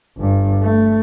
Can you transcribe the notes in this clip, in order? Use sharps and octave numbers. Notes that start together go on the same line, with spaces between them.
G1 G2
A3